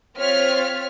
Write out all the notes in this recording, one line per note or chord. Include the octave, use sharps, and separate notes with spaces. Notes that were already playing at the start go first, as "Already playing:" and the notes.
C4 F4 C#5 F6 B6